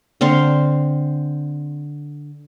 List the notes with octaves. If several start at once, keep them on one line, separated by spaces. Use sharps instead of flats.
D3 C4 F5 C6